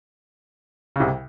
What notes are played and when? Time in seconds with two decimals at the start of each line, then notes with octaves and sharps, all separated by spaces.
0.96 C#3
1.00 C2 C3